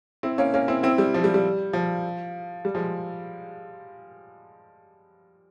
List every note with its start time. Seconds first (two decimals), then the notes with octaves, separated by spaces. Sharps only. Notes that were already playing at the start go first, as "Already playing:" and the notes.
0.23 C4 E4
0.38 A#3 C#4
0.54 A#3 C#4
0.68 C4 E4
0.83 C4 E4
0.98 G3
1.14 F3
1.24 G3
1.34 G3
1.73 F3
2.65 G3
2.75 F3 G#3